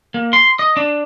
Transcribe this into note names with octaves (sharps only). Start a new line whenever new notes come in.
A#3
C6
D#5
D4